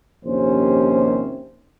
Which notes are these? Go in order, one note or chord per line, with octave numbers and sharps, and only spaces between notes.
A#1 D#2 C3 C#4 C5